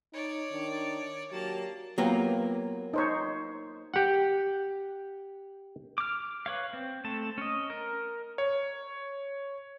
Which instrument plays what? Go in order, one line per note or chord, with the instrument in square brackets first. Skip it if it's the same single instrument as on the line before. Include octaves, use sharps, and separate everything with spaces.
[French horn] D#4 [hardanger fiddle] C#5 D5
[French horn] D#3 [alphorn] D4
[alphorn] F#3 [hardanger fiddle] A#3 A5 [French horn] G4
[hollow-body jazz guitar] F#3 A#3 F4 [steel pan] B3 G4
[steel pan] D#4 C5 C#5
[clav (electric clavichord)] G4 F#5
[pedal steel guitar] D6 F6
B4 C#5 F5
C4
A3 C4 A5
C#4 D#5
A#4
[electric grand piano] C#5